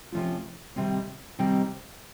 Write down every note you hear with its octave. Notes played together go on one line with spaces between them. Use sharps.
C3 F3 A3 C#4 F4
C3 D#3 G3 C4 D#4
C3 D#3 G3 C4 D#4